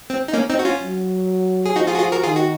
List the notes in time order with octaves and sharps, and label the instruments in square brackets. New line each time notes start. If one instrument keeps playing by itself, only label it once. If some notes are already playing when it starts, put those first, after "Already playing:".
[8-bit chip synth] C4
D#4
A#3 C#4
C4 D#4
F#4
C#4 F4
[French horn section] F#3
[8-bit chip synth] G#4
[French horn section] F3 [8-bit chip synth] D#4 F#4
[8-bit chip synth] F4 G#4
F#4
F4 G#4
F#4 A#4
[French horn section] D#3 [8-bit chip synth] F4 G#4
[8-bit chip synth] F#4